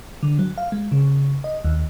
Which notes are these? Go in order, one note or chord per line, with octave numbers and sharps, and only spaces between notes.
D3
F#3
F5
G#3
C#3
D#5
D#2